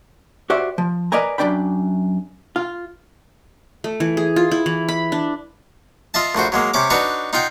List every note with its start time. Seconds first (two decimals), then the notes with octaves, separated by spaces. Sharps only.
0.50 F#4 G4 C5 D5 E5
0.78 F3
1.12 A#4 B4 D5 D#5 G#5 A#5
1.38 F#2 C4 D4 D5 G5 B5
2.56 F4
3.84 A3
4.00 E3
4.17 G#4
4.36 F4
4.51 E4
4.66 E3
4.88 B5
5.12 D4
6.14 F4 D#5 E5 A5
6.35 A#1 A3 F#4 C5
6.52 F#3 G#3 A#3
6.74 C3 C#4 C#5 D6
6.90 D4 D#4 F#4 B4 C#5
7.33 D#4 F4 F#5 G5